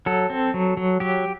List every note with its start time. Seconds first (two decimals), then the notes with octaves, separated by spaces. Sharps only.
0.06 F#3 A4
0.30 C4
0.54 F#3
0.77 F#3
1.00 F#3 G4